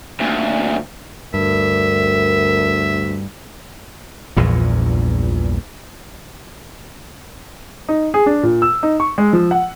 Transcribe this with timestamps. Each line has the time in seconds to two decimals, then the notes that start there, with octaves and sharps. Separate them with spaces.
0.20 D2 A#2
1.34 D2 G2 A#4 E5
4.37 A#1 E2 G2 A#2
7.89 D#4
8.14 G#4
8.26 D4
8.43 A#2
8.62 E6
8.83 D#4
9.00 C#6
9.18 G#3
9.33 F3
9.51 F#5